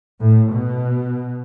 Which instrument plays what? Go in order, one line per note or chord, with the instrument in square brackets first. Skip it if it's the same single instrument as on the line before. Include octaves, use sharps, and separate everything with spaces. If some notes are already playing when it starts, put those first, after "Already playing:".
[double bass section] A2
B2